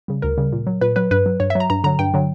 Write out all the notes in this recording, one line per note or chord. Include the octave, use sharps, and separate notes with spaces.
C#3 G3
D2 A#4
C#3 G3
A#2
F#3
A#2 B4
F#3 B4
G2 B4
F#3
G2 C#5
E5
F#3 A#5
G2 A#5
D3 F#3 A#5
G2 G5
D3 F#3